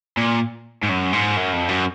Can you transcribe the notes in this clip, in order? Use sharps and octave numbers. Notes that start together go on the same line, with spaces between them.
A#2
G#2
F#2
G#2
F#2
F2
F#2